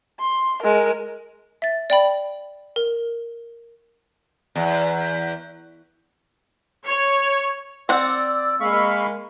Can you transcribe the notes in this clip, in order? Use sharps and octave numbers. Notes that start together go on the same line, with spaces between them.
C6
G#3 A#4
E5 A6
D5 G5 B5
A#4
E2
C#5
C4 D5 F#5 E6
G#3 A#3 F5 B5 C#6